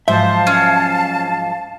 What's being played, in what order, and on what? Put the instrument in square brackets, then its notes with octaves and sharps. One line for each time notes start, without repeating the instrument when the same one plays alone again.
[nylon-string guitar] G#2 F3 F#3 [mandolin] C5 [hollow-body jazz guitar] E5 [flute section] F5 A5
[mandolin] C#4